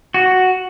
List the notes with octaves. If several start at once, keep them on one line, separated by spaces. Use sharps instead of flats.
F#4